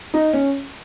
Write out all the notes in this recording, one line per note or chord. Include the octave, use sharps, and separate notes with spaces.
D#4
C#4